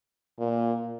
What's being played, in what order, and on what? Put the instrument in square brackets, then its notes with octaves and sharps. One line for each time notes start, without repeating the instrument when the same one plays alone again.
[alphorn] A#2